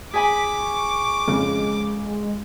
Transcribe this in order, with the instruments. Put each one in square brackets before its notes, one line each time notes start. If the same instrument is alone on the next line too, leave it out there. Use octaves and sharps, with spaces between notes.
[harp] G#4 G#5 B5 [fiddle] D6 [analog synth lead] B6
[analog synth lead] C#6
[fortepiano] F2 C#3 [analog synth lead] G#3